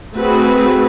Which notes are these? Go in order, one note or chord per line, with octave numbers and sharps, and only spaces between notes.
A3 C4 F#4 G#4 B4